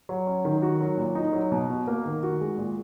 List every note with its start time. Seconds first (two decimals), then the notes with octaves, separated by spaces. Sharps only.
0.09 F#3
0.27 C#4
0.45 D#3
0.62 F#4
0.81 F#3
0.97 A#2
1.15 D#4
1.33 F#3
1.52 B2
1.70 F#4
1.87 A#3
2.05 D#3
2.23 F#4
2.41 G#3
2.58 A#2